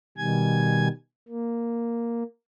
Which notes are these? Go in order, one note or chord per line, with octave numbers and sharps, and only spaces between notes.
B2 D#3 G3 G#5 G#6
A#3